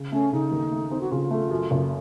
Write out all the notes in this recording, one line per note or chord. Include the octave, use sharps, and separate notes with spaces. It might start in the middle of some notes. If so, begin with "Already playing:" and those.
Already playing: C#3
A3 C#4
C#3 D#4
D#2
A3
C4
F#4
C#3 F4
A3
F#2
F#1